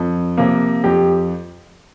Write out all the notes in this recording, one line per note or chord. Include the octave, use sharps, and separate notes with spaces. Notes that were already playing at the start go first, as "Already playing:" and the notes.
Already playing: F2
C3 F3 A#3
F2 G4